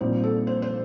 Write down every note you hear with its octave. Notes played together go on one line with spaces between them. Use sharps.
A#1 A#2 G3 C4 D#4 C5
A4
C5
C5